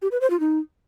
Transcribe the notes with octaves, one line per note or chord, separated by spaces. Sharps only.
G4
B4
C5
F4
D#4